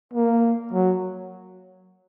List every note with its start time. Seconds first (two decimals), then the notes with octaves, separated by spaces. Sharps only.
0.14 A#3
0.73 F#3